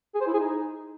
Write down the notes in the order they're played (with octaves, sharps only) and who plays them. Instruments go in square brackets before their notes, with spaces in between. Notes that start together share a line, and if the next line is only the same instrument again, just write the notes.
[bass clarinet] G#4
C5
E4
G#4
D#4